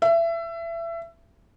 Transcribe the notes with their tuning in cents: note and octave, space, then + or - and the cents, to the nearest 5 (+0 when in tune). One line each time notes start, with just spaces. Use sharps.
E5 +25